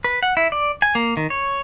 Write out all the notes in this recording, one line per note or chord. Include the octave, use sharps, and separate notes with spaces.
B4
F#5
E4
D5
G#5
A#3
D#3
C#5